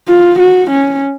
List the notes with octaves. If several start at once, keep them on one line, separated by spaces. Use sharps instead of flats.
F4
F#4
C#4